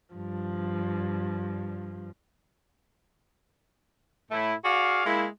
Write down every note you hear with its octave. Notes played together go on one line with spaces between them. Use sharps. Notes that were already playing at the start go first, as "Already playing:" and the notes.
G2 F3
A2 A3 E4
F#4 G#4 D5 F5
G#3 A#3 E4